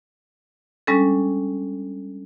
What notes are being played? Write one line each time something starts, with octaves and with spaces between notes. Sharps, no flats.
G3 G#3 C#4 D4 A4